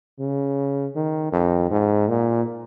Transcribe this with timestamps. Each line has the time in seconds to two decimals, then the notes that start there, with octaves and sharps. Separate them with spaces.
0.19 C#3
0.96 D#3
1.32 F2
1.71 G#2
2.08 A#2